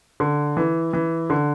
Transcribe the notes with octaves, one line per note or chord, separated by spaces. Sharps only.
D3
E3
E3
D3